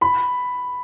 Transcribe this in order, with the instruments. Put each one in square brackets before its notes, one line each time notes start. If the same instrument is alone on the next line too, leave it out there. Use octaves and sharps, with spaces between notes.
[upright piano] B5